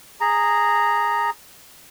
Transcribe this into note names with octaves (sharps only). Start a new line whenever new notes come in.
G#4 A#5